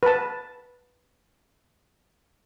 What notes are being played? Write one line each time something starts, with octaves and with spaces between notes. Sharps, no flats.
B4 A5